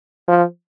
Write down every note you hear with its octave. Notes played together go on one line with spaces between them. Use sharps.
F3